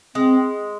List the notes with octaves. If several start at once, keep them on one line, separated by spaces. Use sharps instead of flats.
G#3 C4